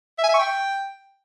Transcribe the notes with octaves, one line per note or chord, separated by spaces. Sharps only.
E5
G#5
E5
C#6
G5